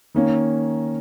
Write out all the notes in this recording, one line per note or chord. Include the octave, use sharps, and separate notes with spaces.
D#3 A#3 C#4